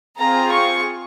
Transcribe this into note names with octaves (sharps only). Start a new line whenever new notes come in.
C4 F4 G#4 A#5
C#6